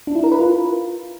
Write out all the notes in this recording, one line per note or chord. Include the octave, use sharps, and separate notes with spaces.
D4
E4
A#4
B4
F4